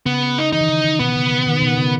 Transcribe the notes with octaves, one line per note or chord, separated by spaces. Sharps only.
C#3 B3
D#4
E3 D#4
D#3
C#3
D#3
B2 B3
C#3
C#3
D#3
B2
C#3